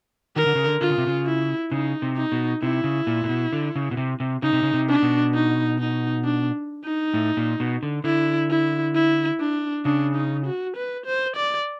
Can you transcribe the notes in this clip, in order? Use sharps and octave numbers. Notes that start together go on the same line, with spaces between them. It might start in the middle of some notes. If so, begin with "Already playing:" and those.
D#3 A#4
D3
C#3
D3
D3 F4
C#3
C3
C#3
E4
C#3 D#4
C3
D#4
B2
C3 E4
C#3
A#2
A#2
B2
D3
C#3
B2
C3
C3
C#3 D#4
C3
C#3
C3
D4
B2
D#4
D#4
D4
D#4
A2
A#2
B2
D3
D3 E4
E4
E4
D4
C#3 D4
D#4
F#4
B4
C5
D5